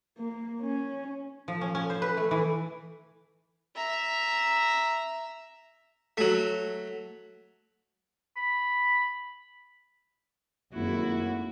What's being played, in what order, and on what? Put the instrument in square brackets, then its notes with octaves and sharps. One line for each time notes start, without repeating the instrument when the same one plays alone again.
[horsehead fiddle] A#3
C#4
[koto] F3
C#4
C#4
C5
B4
A3
E3
[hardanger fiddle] E5 A#5
[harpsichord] F#3 A3
[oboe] B5
[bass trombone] G#1 [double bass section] F#2 [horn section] A2 F#4 [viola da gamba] A#3 E4